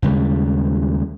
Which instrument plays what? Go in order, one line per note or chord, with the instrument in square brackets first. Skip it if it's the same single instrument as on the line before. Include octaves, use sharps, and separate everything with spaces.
[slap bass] D#2 C#3 G3 G#3